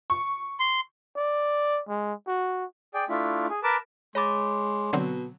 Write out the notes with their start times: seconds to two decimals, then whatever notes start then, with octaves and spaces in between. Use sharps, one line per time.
0.10 C#6
0.60 C6
1.17 D5
1.88 G#3
2.27 F#4
2.94 G#4 D5 G5
3.09 A3 D4 E4 F4
3.50 G#4
3.63 A#4 B4 A5 D6
4.15 G#3 C#5 B5 C6 D6 A6 A#6
4.93 B2 D3 F#3 C4